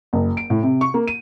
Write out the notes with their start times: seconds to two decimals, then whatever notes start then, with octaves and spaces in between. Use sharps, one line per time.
0.13 F#1
0.37 D7
0.50 A2
0.63 C3
0.81 C#6
0.94 A#3
1.07 D#7